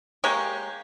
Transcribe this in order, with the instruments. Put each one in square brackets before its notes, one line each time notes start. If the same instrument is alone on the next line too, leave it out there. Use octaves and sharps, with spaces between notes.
[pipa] G#3 A#3 G4 C#5